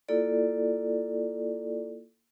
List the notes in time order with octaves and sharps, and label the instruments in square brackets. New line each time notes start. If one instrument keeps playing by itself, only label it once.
[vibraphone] A#3 E4 F4 A4 D5